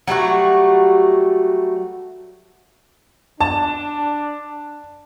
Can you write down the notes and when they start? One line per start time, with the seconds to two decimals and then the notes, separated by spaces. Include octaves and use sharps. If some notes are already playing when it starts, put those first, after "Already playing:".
0.07 F#3 G3 A3 F#4
3.41 D4 A5